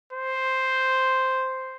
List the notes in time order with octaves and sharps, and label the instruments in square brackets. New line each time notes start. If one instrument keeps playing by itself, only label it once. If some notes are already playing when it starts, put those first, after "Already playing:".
[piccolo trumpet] C5